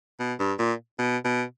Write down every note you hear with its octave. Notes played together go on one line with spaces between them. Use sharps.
B2
G2
A#2
B2
B2